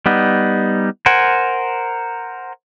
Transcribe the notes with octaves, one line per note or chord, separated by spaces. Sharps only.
G3 B3 D#4
A#4 C5 F#5 G#5